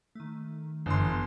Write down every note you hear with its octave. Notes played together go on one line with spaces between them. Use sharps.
D#3 A3
G1 F#2 D3 E3 C6
B3